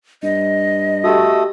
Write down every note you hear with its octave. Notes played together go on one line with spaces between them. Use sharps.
G2 D#5
A3 F#4 G4 A4 D#6